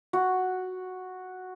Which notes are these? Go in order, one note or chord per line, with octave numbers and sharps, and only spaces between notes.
F#4